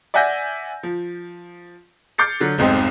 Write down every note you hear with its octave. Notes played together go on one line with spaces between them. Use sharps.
D5 E5 F#5 G#5 G6 A#6
F3
D6 F6 G6 A6 C7 C#7
D3 F#3
F1 B1 G#2 C4 D#5